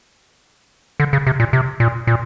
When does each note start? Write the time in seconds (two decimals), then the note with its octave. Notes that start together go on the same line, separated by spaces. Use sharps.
1.00 D3
1.13 C#3
1.27 C3
1.40 A#2
1.53 C3
1.80 A#2
2.07 A#2